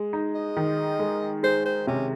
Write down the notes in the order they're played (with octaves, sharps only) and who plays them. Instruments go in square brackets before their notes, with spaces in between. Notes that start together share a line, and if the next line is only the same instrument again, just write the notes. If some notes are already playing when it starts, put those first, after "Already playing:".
Already playing: [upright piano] G#3
D#4
[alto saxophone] D#5
[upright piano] D#3
G#3
[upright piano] G#3 [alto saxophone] C5
[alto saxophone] C5
[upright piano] C3 [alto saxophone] C#4